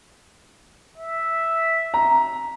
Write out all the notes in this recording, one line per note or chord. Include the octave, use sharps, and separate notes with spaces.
E5
A#5